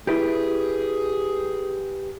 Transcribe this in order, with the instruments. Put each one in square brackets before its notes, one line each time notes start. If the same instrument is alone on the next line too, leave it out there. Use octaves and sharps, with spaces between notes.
[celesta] E4 E5 D7 [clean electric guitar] G4 B4 [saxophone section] G#4